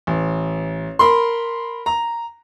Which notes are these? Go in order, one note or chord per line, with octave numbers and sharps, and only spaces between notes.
A1
A#4 B5 C6
A#5